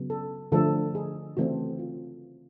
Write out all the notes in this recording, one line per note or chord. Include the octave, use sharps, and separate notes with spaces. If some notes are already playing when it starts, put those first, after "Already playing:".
Already playing: C#3 F#3 B3
A4
D3 F3 A3 A4
G#4
C#3 E3 A3 C4 F#4
F4